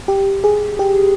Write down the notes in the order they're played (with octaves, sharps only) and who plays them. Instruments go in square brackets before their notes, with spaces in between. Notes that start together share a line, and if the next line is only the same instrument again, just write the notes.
[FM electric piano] G4
G#4
G4